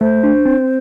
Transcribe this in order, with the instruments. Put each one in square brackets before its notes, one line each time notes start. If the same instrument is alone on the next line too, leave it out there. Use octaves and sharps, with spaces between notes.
[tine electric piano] A3 [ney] C5
[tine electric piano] D4
C4